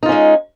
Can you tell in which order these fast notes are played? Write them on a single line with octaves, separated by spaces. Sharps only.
D#4 F4 C#4 G#3